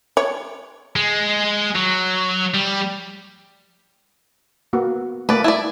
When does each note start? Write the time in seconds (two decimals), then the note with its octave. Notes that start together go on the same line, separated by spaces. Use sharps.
0.17 C#5
0.96 G#3
1.75 F#3
2.54 G3
4.73 A#3 B3 F#4
5.29 A3 A#3 B4 D5
5.44 E4 D5